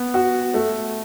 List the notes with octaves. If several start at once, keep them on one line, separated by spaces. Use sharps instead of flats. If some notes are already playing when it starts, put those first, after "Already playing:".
Already playing: B3
F#4
A3